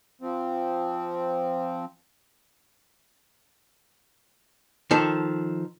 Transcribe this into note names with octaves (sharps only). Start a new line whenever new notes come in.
F3 C4
D#3 F3 A4